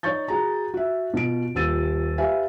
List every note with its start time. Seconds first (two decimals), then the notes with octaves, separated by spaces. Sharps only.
0.03 D#4 C#5 D5 C#6 G6 A6
0.28 F#4 G#4 A#5
0.74 F#4 E5
1.14 B2 F4 D7
1.55 D#1 F4 G4 E6 A6 D#7
2.18 G4 B4 E5 F5 G#5